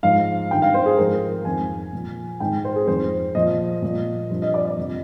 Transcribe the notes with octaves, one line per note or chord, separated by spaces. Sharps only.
G#2 F3 F5
G2 D#3 G5
F5
C5
G#4
G#2 F3 A#4
F2 D#3 G#5
A#2 F3
G#2 D#3 G5
C5
G#4
F2 D#3 C5
A#2 F3 D#5
A#2 F3
G2 F3
D#5
D5
D5
F2 C3 F3